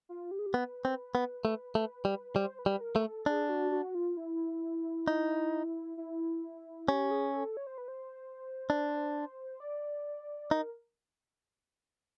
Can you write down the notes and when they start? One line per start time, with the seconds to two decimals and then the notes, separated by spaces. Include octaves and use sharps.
0.09 F4
0.31 G4
0.39 G#4
0.46 G4
0.54 B3 B4
0.85 C4
1.15 B3
1.45 A3
1.75 A3
2.05 G3
2.36 G3 C5
2.59 B4
2.66 G3
2.81 A#4
2.96 A3
3.04 A4
3.26 D4 G#4
3.49 F#4
3.72 F#4
3.95 F4
4.17 E4
5.08 D#4
5.97 E4
6.88 C#4 G4
7.11 G#4
7.34 A4
7.57 C#5
7.67 C5
7.78 B4
7.88 C5
8.70 D4
9.60 D5
10.51 D#4 A#4